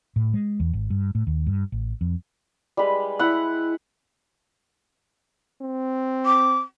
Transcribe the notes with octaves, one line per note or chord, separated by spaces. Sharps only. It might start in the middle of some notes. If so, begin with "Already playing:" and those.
A2
G#3
E2
G#1
G2
A2
D#2
G2
A1
F2
G3 G#3 B4
E4 F#5
C4
D6